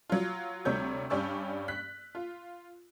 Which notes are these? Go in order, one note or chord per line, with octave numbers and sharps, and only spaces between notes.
F#3 F4
D2 C3 G3 C#5 G6
G2 C#4 G4 D5 C#6 E6
F#6 B6
F4